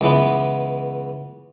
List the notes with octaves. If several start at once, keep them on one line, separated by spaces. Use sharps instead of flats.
C#2 E3 B3